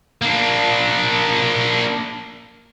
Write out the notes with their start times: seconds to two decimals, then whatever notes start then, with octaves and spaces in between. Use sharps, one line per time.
0.22 A#3 D4